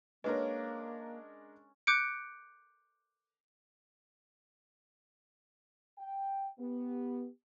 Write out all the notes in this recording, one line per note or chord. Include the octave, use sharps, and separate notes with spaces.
G#3 A#3 C#4 D4 A#4 B4
D6 F#6 G6 C#7 D7
G5
B3 G4